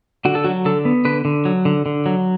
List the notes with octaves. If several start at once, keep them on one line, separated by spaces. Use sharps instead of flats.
D3 F#4
A4
F#3 F#4
D3 A4
B3
D3 B4
D3
F#3
D3
D3
F#3